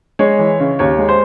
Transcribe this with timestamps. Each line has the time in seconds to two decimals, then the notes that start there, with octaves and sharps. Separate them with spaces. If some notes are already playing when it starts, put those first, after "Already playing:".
0.19 G#3 C#5
0.39 E3
0.60 C#3
0.79 D#2 C#5
0.99 G#3
1.09 C5